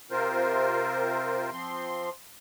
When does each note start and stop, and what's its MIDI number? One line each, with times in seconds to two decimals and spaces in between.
0.11 1.50 48
0.11 1.50 60
0.11 1.50 65
0.11 1.50 70
0.11 1.50 72
1.52 2.10 53
1.52 2.10 60
1.52 2.10 84